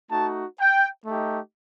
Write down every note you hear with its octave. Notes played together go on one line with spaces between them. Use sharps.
A3 D#4 F#4 A5
G5
A3 D#4 G4